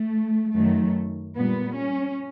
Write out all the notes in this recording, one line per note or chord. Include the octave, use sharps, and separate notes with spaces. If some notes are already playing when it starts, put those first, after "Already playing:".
Already playing: A3
F#2 D#3 F#3 A3
A#2 G3 B3
C#4